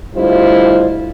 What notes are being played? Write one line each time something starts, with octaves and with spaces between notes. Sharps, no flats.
D2 G3 E4 F4 C5 D#5